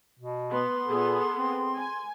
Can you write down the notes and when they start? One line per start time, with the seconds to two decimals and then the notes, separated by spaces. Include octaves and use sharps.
0.19 B2
0.52 B3 C6
0.88 A#2 B3 G#4 A4
1.36 C4
1.78 G#5